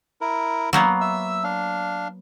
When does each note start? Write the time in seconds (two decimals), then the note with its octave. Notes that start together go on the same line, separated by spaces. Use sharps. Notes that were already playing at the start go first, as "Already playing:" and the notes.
0.21 E4 A#4
0.73 F#3 A#3 B3
1.01 E5 E6
1.44 D4 F5